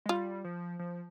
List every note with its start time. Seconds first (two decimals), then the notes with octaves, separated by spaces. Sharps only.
0.06 G#3
0.09 G3 F4
0.45 F3
0.79 F3